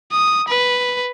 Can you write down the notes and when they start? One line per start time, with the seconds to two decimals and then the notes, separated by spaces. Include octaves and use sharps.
0.12 D#6
0.49 B4